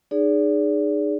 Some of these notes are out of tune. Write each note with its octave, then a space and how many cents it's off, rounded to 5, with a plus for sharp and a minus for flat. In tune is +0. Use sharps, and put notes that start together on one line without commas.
D#4 -35 G#4 +0 D5 -35